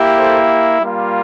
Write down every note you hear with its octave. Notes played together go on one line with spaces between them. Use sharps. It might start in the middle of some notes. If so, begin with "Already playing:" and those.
Already playing: A#3 E4 G4
A4 C5
G3 A#3 F4